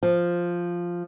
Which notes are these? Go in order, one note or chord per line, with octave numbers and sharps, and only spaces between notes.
F3